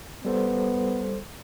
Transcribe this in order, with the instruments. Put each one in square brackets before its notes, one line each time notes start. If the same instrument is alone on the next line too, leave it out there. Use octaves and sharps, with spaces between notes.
[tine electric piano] G3 A4 C5 [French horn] B3